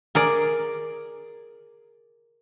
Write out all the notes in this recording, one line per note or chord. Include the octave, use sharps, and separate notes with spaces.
G#4 A#4 D5